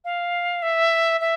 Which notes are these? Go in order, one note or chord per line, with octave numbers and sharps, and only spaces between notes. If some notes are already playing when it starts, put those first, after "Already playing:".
F5
E5
E5